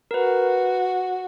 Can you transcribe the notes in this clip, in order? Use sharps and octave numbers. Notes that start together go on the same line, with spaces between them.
A#4
F#4 B4